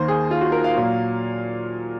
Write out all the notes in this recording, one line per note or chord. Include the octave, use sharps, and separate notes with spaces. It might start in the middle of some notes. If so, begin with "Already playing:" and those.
Already playing: D#2 D#3 A#3 C5
G#4
F4
F#4
A#4
F5
A#2 F#3 A#3